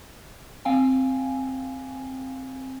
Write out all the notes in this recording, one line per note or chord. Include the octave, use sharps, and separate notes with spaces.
C4 F5 G5 G#5